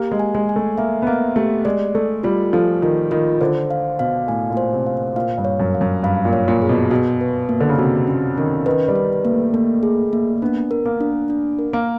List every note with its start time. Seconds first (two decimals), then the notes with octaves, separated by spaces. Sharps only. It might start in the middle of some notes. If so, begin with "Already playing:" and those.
Already playing: A#3 G4
0.11 G#3
0.19 G#5
0.35 G#3
0.49 G#5
0.56 A3
0.78 A#3 E5
1.02 B3
1.07 A#3 E5
1.36 A3 G4
1.65 G#3 D5
1.95 A3 A4
2.23 G3 F4
2.53 F3 A4
2.82 D#3 F4
3.11 D#3 F4
3.41 D3 C5
3.70 F5
3.99 B2 F5
4.28 A2 G#5
4.50 A#2
4.57 C5
4.72 C3
4.86 F5
5.16 A#2 F5
5.38 G2
5.45 C#5
5.60 F#2
5.74 F5
5.81 F#2
6.03 G2 F5
6.25 A#2
6.33 C#5
6.48 A#2
6.62 G#4
6.69 B2
6.91 B2 F#4
7.21 B4
7.49 A#3
7.60 D3
7.69 C#3
7.78 C3 F#4
8.07 C#4
8.37 D#3 C#4
8.66 D#3 B4
8.88 G3
8.96 B4
9.25 A#3
9.32 A3
9.53 A3 A#3
9.83 G#4
10.13 A#3
10.42 B3 D4
10.71 A#4
10.85 A#3
11.01 D4
11.30 D4
11.59 A#4
11.73 A#3